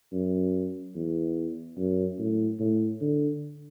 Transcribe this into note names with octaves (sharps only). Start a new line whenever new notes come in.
F#2
E2
F#2
A2
A2
D3